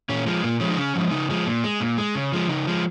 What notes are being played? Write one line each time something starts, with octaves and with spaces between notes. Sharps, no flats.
A#2 C#4
F3 G#3
A#2 A#3
F3 G#3 C#4
D#4
C#3 C#4
F3 G#3
C#3 D#4
F3 G#3
A#2
G#3
A#2
G#3
C#3
F3 G#3
C#3 D#4
F3 G#3